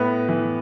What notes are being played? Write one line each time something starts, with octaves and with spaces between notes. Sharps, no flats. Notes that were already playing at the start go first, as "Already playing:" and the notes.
Already playing: A2 B3 B4
E3